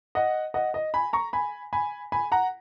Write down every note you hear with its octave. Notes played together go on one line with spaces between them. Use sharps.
D#5 F#5
D#5 F#5
D#5
G#5 B5
A#5 C#6
G#5 B5
G#5 B5
G#5 B5
F#5 A#5